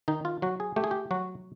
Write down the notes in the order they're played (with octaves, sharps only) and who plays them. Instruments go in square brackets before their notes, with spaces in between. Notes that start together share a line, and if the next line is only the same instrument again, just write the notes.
[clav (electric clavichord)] D#3 D#4
F4
F#3 F#4
G#4
A3 G4
G#4
G4
F#3 F#4